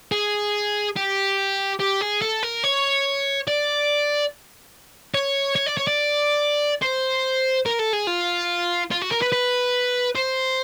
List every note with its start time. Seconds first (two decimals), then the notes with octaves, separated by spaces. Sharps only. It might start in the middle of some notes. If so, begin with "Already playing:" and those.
0.12 G#4
0.97 G4
1.80 G4
2.01 G#4
2.22 A4
2.43 A#4
2.64 C#5
3.48 D5
5.15 C#5
5.56 C#5
5.66 D5
5.77 C#5
5.87 D5
6.82 C5
7.66 A#4
7.79 A4
7.93 G#4
8.07 F4
8.91 F4
9.02 F#4
9.11 A#4
9.22 B4
9.32 B4
10.16 C5